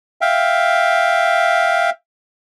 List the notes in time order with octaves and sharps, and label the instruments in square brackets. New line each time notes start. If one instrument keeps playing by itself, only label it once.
[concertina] E5 F5 G5